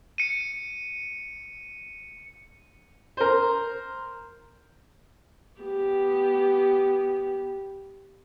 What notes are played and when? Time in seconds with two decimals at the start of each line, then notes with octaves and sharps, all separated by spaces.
0.18 C#7 D#7
3.17 A#4 C5
5.61 B3 G4